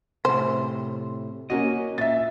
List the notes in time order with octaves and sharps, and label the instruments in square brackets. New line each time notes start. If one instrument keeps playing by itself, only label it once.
[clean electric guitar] A2 C3 [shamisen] C5
[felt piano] A#3 C#4 F#4 [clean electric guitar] D#5
[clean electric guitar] A#2 [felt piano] E5 A6